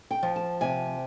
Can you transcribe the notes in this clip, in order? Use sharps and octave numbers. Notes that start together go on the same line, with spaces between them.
G5
F3
A5
C3 G#5